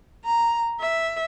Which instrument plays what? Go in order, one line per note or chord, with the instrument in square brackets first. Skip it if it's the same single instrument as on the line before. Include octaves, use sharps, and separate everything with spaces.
[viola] A#5
E5